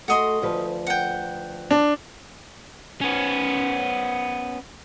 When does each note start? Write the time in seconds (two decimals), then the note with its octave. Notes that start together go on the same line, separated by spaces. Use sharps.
0.08 A3 F#4 D#5 C6
0.42 D2 F3 B4
0.87 F#5 G5
1.71 D4
3.01 B3 C#4